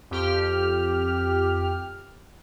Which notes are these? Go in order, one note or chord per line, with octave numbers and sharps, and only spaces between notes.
F2 G4 F6